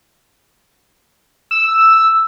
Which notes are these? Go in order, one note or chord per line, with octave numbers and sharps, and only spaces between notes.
E6